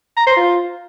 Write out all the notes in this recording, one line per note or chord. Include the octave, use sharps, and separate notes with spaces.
A#5
C5
F4